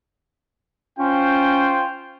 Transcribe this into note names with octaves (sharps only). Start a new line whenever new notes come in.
C#4 F4 C5 G5